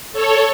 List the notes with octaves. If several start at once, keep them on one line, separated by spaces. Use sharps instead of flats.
A4 C#5